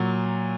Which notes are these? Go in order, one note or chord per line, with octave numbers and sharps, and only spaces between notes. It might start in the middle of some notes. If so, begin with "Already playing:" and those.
Already playing: A#2 F#3